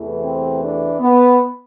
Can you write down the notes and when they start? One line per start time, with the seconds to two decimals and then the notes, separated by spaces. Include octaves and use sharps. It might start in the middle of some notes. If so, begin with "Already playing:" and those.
Already playing: E2 C3 E3 A3
0.23 C4
0.62 D4
1.00 B3